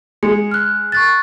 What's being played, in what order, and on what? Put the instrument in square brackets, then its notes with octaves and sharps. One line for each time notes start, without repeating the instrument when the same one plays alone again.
[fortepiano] G#3 [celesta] C#7
[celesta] F6 F#6
C#6 F#6 A6